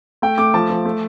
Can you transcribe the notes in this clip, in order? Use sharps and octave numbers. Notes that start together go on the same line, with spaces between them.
A3 G5
A3 D6
F3 A5
F3
A3